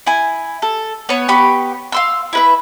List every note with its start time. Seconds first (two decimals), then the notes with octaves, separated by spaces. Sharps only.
0.06 E4 G#5
0.62 A4
1.09 B3 C#5
1.28 B3 G4 B5 C#6
1.92 F5 C6 E6
2.33 E4 B4 E5